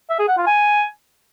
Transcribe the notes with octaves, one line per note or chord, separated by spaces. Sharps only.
E5
G#4
F#5
F4
G#5